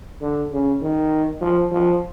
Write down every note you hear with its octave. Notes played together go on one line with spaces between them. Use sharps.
D3
C#3
D#3
F3
F3